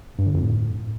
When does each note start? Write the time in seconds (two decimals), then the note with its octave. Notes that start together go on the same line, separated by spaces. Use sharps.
0.19 G2
0.26 D3
0.34 F2
0.42 A2